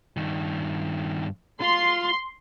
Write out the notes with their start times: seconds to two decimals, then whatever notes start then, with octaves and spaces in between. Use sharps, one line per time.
0.17 G2 D#3
1.61 F4 C6